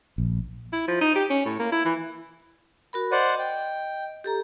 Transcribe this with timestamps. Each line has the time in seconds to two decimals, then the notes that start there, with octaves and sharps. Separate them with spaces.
0.18 A#1
0.73 E4
0.88 F3
1.01 D#4
1.15 G4
1.30 C#4
1.46 A2
1.59 A#3
1.72 E4
1.85 E3
2.93 F#4 A#4 B5
3.12 C5 D5 D#5 F#5
3.39 G5
4.24 G4 A4 A#5